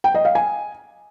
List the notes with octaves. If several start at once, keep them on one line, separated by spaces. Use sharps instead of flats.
G5
D#5
F5
G#5